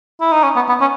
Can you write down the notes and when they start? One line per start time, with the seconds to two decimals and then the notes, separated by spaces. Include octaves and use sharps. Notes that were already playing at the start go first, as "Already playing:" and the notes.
0.21 E4
0.32 D#4
0.43 C#4
0.56 B3
0.68 B3
0.81 C#4